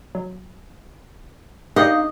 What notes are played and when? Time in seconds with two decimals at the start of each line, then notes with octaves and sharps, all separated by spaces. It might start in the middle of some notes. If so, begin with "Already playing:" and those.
0.15 F#3
1.76 D4 D#4 G4 A#4 D5 D#5 F5